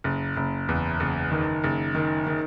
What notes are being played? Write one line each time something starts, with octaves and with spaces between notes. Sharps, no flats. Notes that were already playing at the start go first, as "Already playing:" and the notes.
F#1
F#1
E2
F#1
D#3
F#1
D#3
D#3